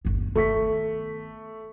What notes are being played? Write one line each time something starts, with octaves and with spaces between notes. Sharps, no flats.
G1 D#2
D#3 A3 B3 C#6 B6